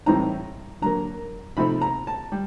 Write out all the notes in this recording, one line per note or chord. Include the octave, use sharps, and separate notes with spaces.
A2 E3 G3 C4 D#4 A#5
D3 F#3 A#3 A#5
C3 F3 A3 C4 D#4 B5
A#5
A5
G3